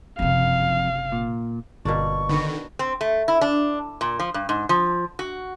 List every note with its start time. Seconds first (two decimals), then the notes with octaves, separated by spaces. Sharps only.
0.19 F#1 F2 C3 F5
1.12 A#2
1.85 G1 B2 A#3 D4 C#6
2.29 D3 D#3 B3 F#4
2.79 C4
3.01 A3
3.28 E4
3.41 D4
4.01 A#2
4.20 F3
4.34 G2
4.49 G#2
4.69 F3
5.19 F#4